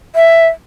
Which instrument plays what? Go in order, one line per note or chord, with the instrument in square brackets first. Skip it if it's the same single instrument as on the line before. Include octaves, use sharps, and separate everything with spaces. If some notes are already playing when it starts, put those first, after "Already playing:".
[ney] E5